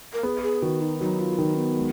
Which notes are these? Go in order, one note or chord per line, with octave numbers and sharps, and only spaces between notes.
A#4
B3 G#4
G#4
D#3 F#4
D#4
F#3 D#4
F4
D#3 D#4
B3
G#3